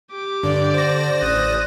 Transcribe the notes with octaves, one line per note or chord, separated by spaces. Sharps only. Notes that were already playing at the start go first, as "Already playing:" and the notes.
G4 D6
G2 D3 D5
C5 A#6
A1 D#6 F#6